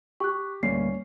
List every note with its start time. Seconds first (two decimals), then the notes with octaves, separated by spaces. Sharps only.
0.20 G4 C#6 F#6
0.63 D2 G3 A#3 C#4 C7